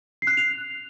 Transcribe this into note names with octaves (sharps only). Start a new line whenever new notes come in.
C7
F#6
C7
F7